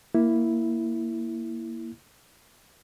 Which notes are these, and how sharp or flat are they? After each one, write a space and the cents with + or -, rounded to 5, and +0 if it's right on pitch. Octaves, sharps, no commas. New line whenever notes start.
A#3 +0 E4 +0